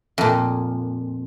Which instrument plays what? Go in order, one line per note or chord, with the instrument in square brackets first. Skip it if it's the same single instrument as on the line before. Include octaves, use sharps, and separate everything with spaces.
[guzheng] F2 A#2